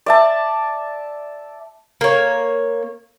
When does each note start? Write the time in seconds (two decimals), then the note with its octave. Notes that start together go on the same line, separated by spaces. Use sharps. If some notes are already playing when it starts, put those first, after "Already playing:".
0.06 D5 E5 A5
2.01 A#3 C#5